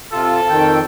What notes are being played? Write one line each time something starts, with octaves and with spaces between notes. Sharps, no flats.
C3 F4 A4
F2 D#3 G5